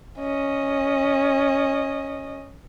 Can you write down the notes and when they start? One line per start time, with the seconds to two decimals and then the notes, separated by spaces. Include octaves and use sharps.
0.19 C#4 D#5